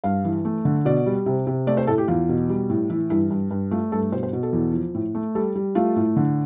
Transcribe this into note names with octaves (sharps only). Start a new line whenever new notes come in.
G2 F5
E3
A3
D3
B2 D5
G3
C3
C3
A3 D5
C5
A2 A4
G4
E2 F4
B2
G3
A2
E3 E4
G2 E4
G2
G2
A3 F4
G2 A4
B2 C5
C5
B2
A4
E2
F3
A2
A3
G3 A4
G3
A3 F4
A2
D3